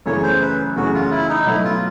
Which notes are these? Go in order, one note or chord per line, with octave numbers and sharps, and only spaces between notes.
F#2 C#3 E3 A3 C#5
C5
B4
F#2 C#3 E3 A3 F#4
F4
E4
D#4
B2 F#3 A3 E4
F4